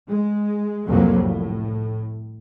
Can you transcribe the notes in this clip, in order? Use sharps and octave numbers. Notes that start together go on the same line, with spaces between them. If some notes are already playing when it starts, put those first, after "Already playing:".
G#3
C2 F2 G#2 F3 F#3 A#3
A2